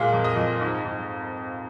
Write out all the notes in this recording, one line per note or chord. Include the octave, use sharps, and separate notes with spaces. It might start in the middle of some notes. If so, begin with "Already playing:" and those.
Already playing: A#2 G#3 F5
F2
D#5
F2
G#2
G#2